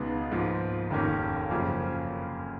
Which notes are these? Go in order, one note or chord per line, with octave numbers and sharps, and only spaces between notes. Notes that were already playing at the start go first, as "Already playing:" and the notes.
Already playing: C#2 B2 G#3 B3 D#4
G#2 F3 A#3
F1 D#2 D#3 A#3 C#4
F#2 C#3 F3 A#3